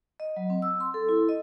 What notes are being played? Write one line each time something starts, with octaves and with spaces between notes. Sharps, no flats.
D#5
F#3
C4
E6
C6
A4
E4
D#5